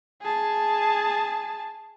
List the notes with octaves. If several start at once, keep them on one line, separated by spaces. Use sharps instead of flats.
G#4 A5